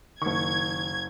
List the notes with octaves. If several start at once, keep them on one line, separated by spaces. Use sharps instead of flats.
F#1 D#3 C#6 G#6